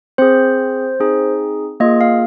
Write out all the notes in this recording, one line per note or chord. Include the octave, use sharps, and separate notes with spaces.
C4 G#4 C5
C4 D#4 G#4
A#3 F4 G#4 D#5
F5